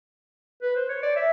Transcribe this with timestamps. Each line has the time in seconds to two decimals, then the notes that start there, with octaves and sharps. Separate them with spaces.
0.62 B4
0.76 C5
0.89 C#5
1.03 D5
1.16 E5